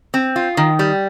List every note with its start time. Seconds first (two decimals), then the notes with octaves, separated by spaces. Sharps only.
0.14 C4
0.36 F4
0.57 D#3
0.79 G3